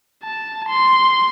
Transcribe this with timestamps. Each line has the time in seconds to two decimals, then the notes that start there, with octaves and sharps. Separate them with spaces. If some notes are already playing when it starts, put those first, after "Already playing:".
0.24 A5
0.69 C6